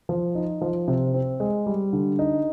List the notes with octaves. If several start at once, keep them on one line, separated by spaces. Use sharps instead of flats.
F3
D#4
F3
C3
C4
G#3
G3
D3
D#4